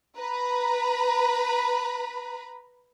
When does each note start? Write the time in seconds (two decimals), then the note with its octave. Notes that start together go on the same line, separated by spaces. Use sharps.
0.17 B4 A#5 B5